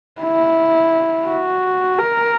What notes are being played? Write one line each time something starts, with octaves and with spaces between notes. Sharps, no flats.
E4
F#4
A#4